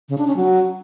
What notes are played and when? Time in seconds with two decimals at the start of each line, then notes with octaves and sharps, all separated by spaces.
0.09 C#3
0.18 D4
0.27 C#4
0.37 F#3